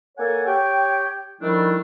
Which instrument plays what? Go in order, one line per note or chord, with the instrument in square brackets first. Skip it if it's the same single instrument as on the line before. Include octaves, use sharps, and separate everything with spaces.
[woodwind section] A#3 A4 C#5 F#5 G#5
G4 C#5 G5
D#3 F3 G3 A3 D4 E4